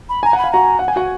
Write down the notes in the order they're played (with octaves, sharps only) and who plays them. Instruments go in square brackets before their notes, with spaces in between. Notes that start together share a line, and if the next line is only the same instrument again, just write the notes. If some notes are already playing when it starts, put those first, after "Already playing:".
[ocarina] B5
[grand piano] G#5 [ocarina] A#5
[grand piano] F#5 [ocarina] B5
[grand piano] F5
[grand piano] F#4 F#5 [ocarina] A#5
[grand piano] F#5
G#5
F#4 F#5